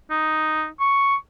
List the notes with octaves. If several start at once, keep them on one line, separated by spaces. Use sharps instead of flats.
D#4
C#6